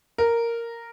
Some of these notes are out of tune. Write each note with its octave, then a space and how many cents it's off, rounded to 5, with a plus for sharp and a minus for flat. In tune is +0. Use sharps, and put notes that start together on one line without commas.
A#4 -5